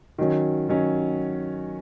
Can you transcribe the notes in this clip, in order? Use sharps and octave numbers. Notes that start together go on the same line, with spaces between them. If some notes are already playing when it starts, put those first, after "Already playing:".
D#3 F#3 C#4
D#3 F#3 C#4